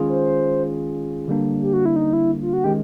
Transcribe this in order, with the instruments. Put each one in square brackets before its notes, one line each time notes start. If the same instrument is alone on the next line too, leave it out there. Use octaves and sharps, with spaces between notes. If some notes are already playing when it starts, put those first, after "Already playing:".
Already playing: [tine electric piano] D#3 G#3 C#4 F4 G#4
[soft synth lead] C5
[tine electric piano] D3 G3 A#3 D4
[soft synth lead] G4
F#4
E4
D#4
E4
F4
F#4
[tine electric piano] D#3 G#3 C#4 [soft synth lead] G4